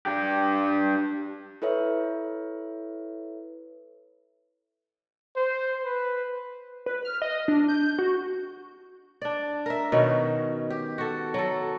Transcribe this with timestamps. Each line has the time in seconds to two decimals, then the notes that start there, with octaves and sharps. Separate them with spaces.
0.06 D4 G4
1.62 E4 A4 B4 C#5 E5
5.36 C5
5.84 B4
6.86 B4
7.05 F6
7.22 D#5
7.48 D4
7.68 G6
7.99 F#4
9.22 D4 D5
9.66 A#4 E5
9.92 B2 D#3 F#3 C#4
10.70 G4
10.98 F#4 A4
11.34 F#3 A4